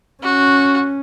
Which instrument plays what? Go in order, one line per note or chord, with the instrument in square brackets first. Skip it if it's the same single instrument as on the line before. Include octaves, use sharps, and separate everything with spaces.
[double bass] C#4 [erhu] F#4